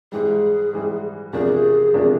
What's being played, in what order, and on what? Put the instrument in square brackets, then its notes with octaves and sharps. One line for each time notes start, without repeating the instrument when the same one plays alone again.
[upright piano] G#2 E3 G3 [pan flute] G#4
[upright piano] G#2 E3 G3
[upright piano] E2 C3 F3 A#3 D4 [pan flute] G#4
[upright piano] E2 C3 F3 A#3 D4